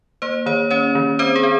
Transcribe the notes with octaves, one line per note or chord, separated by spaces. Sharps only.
A#3 C5
D#3 C#5
C#4 C#5
D#3
C4 C5
G#4
C4